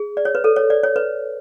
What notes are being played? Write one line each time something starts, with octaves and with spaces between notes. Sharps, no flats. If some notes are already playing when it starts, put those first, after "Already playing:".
Already playing: G#4
D5
C#5
B4
A4
C#5
D5
C#5
B4